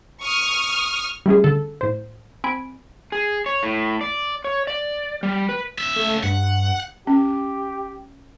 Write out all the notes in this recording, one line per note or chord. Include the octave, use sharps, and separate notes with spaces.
C#6 D#6 F6
G3 A3 C#4 G#4
D3 A4
A2 C5
C4 G#5 B5 D7
G#4
C#5
A2
D5
C#5
D5
G3
B4
C#2 E5
A3
G2 F#5
C#4 G4